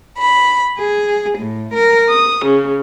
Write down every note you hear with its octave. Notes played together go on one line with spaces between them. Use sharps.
B5
G#4
A2
A#4
D#6
C#3